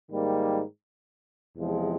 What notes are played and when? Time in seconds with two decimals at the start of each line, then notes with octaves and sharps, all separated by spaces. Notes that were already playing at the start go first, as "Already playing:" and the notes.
0.11 G#2 D#3 G3 A#3
1.56 E2 C3 F3 G#3